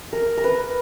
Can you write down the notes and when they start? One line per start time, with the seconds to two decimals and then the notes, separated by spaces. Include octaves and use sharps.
0.13 A#4
0.37 A#4
0.44 B4